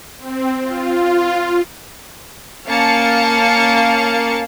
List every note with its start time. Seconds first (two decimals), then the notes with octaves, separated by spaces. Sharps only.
0.19 C4
0.62 F4
2.69 A#3 C#4 F5 A5 C#7